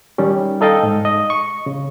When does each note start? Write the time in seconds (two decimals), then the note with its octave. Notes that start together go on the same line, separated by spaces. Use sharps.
0.18 D#3 G3 C#4
0.61 D#4 A4 D#5 F5 G5
0.83 G#2
1.05 D#5
1.30 C#6
1.66 C#3